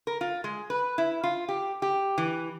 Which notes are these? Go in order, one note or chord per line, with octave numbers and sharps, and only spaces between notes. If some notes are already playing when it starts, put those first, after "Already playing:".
A#4
F4
G#3
B4
E4
F4
G4
G4
E3